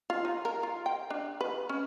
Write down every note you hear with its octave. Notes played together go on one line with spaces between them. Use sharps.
F4
D#4
A#4
F4
G5
D4
B4
C#4